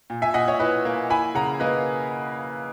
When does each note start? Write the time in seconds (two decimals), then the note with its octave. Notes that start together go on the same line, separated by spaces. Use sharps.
0.10 A#2
0.22 E5 G#5
0.34 A#2 D#5 F#5
0.47 C#5 E5
0.59 E4 B4 D#5
0.85 A#3
1.10 E4 G#5 B5
1.35 C#3 F#5 A#5
1.60 A#3 B4 D#5